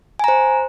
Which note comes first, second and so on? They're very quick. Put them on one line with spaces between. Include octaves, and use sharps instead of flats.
G#5 A#5 C5